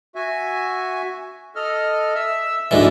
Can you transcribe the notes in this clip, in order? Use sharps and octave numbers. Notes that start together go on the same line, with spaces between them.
F#4 E5 G#5
A4 D#5 F6
E5 E6
D2 G#2 E3 B4 D5